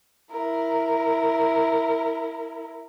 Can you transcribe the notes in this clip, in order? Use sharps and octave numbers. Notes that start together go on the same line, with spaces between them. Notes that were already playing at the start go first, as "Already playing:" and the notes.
E4 A#4